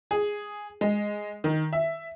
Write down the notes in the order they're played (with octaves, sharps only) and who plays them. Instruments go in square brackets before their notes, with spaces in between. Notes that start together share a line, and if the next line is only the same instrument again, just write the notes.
[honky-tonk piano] G#4
G#3
D#3
E5